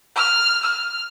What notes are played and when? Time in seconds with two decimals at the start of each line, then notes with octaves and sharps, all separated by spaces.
0.16 F6
0.62 F6